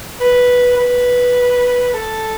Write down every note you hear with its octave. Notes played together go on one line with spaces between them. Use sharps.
B4
B4
A4